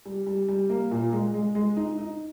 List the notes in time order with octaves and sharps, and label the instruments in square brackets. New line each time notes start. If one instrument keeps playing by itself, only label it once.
[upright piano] G3
G3
G3
A#3
A#2
G#3
G#3
G#3
D#4
D#4